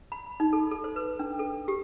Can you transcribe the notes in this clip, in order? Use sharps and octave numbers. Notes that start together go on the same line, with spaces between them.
B5
D#4
A4
A4
C5
B4
D4
A4
G4